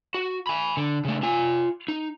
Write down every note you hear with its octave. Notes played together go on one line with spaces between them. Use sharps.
F#4
G#5 B5
D3
C#3 A3
F4 G#5
D#4